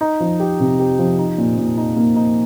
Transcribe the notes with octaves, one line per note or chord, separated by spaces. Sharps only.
D#4
F3
G4
C3
G4
F3
D#4
A#2
A#2
D#4
A#3
D#4